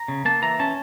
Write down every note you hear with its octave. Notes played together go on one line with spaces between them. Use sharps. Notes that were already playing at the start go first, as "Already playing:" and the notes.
Already playing: A#5
C#3
A#3 A5
E3 A#5
C#4 A5